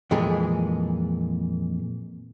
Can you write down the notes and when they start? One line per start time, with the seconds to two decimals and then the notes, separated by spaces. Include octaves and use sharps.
0.11 F2 A#2 E3 G#3 G#4